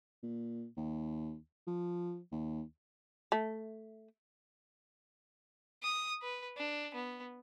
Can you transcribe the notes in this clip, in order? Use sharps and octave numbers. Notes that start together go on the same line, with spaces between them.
A#2
D#2
F3
D#2
A3
D#6
B4
D4
B3